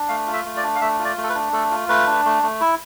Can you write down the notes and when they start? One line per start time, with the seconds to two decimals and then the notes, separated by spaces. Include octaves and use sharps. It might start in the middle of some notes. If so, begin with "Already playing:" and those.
Already playing: D4
0.09 A3 F5
0.27 F4
0.33 E5
0.45 A3
0.57 D5
0.63 D4
0.75 F5
0.81 A3 E5
0.99 F4
1.05 D5
1.17 A3
1.23 A4
1.29 B4
1.35 D4
1.53 A3 A4
1.71 F4
1.89 A3 B4
2.07 D4
2.25 A3
2.43 A3
2.61 E4